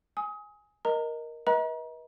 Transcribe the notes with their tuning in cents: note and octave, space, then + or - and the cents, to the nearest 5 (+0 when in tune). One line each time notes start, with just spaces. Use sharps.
G#5 +0 D#6 +30
A#4 +10 D#5 +0 A#5 -25
B4 -40 D#5 +40 A#5 +35